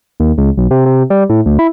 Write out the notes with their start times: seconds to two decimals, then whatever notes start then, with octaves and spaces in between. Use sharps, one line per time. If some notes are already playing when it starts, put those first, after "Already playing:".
0.20 D#2
0.38 C#2
0.57 B1
0.71 C3
0.86 C3
1.10 G3
1.30 A2
1.46 D2
1.59 E4